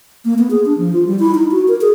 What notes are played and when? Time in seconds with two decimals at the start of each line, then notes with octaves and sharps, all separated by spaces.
0.25 A#3
0.38 B3
0.50 G#4
0.65 D4
0.78 F3
0.93 F4
1.07 G3
1.19 E4
1.35 D#4
1.51 F#4
1.68 A#4
1.81 G#4